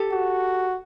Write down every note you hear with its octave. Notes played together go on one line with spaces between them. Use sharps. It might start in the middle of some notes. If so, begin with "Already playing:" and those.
Already playing: G4 A4
F#4